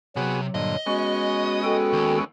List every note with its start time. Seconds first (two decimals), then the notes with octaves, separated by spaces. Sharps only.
0.16 C3 F#3 B3 F#4 G#4
0.55 G2 A#2 D3 D#5
0.86 G#3 B3 C#4 F#4
1.64 F#4 A4 G5
1.93 D#2